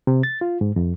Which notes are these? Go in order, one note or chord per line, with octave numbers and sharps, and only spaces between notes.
C3
A6
F4
G#2
F2